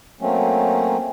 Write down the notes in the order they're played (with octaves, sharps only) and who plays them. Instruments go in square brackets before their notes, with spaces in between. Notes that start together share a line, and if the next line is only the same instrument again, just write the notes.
[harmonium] F#3 A3 A#3 C4 C#4